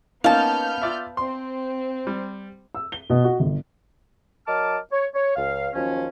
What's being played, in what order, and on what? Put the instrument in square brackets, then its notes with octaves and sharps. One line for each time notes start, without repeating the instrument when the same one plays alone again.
[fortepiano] A#3 C#4 D#4 [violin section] B3 F6 G6 [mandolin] F5 A5
[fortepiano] F4 D5 E5
[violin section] C4 [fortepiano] C6
[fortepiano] G3
[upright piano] E6
G7
B2
F#4
G1
[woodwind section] F#3 A#4 D#5 A5 D6 F6
C#5
C#5
C#2 F5
D#2 F3 F#3 C#4